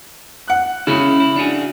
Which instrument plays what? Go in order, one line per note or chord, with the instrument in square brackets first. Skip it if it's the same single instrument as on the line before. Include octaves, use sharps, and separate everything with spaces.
[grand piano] F#5 F#6
[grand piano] C#3 [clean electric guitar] G#3 C#4 E4
[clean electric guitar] E4
D4 F#4 G#4